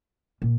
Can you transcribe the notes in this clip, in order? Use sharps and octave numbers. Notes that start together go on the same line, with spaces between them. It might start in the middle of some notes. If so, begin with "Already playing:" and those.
A#2